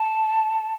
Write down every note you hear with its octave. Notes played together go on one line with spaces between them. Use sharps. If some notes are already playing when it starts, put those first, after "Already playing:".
Already playing: A5